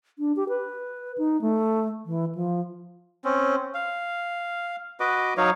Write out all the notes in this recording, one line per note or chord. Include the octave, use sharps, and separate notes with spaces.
D4
G4
B4
D#4
A3
E3
F3
C4 C#4
F5
F#4 B4 D#5 D6
F#3 D#4 C#5 F5